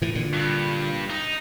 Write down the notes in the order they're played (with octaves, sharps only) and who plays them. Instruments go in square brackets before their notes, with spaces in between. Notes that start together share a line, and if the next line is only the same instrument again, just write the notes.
[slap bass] A2 E3
A#2 D3
[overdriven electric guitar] G2
D#4